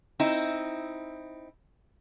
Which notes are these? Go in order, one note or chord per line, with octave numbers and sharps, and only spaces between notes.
C4 D#4 E4